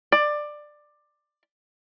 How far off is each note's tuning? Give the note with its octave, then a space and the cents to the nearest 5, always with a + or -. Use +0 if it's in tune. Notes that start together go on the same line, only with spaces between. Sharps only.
D5 +15